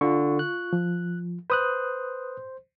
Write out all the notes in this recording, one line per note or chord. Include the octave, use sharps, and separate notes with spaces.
D3 F4 C#6
F#6
F3
B4 C5 D#6 F#6